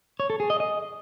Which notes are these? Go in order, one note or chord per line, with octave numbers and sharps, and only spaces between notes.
C#5
A4
G#4
D#5
D#5